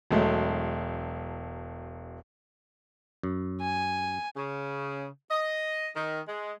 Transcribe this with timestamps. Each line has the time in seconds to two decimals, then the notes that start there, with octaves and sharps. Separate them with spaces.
0.11 E1 F#3 G#3 A3
3.23 F#2
3.61 G#5
4.37 C#3
5.31 D#5
5.96 D#3
6.27 G#3